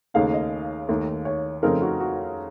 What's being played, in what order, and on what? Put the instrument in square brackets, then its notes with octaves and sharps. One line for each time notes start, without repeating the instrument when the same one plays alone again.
[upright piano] D#2 C#3 A3 D#4 F5
D#5
D#2 D#3 A3
C#5
F2 C#3 A3 C4 D#4 A#4
F#4
F#4